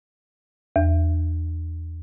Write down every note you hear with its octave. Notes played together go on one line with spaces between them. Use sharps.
E2